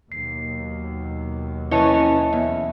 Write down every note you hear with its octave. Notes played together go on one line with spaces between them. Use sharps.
D#2 B2 F#3 C7
E3 C#4 E4 D#5 A5
E2 E5